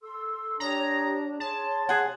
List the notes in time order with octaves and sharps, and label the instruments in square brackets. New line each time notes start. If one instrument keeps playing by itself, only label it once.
[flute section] A4 C6 E6
[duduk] D4 [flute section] G4 C#5 D#6 [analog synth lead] A#5
[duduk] G#4 [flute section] C#5 C6 [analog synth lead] A5
[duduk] C3 [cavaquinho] G#4 F#5